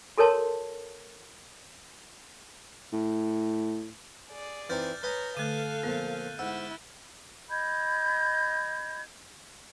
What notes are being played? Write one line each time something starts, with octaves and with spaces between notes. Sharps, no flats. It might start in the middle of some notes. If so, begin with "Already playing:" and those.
F#4 A4 A#4 C#5 A5 C6
A2
G#4 D5
E3 C4 D#4 F6 G6 A6
B4 C#5 D#5 G#5 A#5 G6 G7
D3 A3 A4 F5 F#6 D#7
A#2 F3 B3
G#2 E4 F#5 E6
D#5 B5 G6 G#6